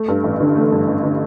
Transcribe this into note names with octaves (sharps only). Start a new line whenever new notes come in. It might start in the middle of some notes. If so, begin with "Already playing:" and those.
Already playing: A3
G2
A1
D3
A3
G2
A1
D3